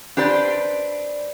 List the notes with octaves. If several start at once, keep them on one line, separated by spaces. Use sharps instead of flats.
D4 G4 B4 C5 D5